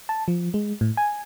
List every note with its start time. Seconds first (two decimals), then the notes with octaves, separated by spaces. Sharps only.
0.09 A5
0.28 F3
0.54 G#3
0.81 A2
0.97 G#5